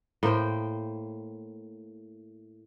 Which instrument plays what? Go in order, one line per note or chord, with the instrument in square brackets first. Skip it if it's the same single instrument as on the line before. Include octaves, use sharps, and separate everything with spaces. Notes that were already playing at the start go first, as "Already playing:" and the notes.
[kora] A2 A#3 C5 G5